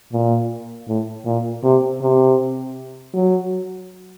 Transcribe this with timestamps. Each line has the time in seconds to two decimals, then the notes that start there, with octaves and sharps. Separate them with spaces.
0.12 A#2
0.87 A2
1.25 A#2
1.64 C3
2.01 C3
3.14 F#3